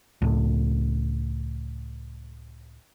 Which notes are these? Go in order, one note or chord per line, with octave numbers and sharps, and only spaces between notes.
C#2 A2